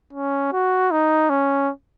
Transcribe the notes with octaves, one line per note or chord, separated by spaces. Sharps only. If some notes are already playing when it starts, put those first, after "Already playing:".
C#4
F#4
D#4
C#4